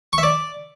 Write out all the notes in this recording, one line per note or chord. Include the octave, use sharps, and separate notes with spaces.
C#6
E5
D5